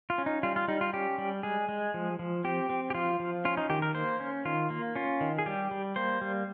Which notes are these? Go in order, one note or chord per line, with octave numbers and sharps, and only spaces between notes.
F4
C#4
D#4
G3 F4
F4
G3 D#4
F4
C#4 G4
G3
G#3 G#4
G#3
F3
F3
C4 G4
C4
G4
F3 F4
F3
C#4 F4
D#4
D#3 G4
A#4
A#3 C5
C#4
D#3 F4
A#3
C#4 F4
D#3
G#4
G3 G4
G3
A#3 C5
G3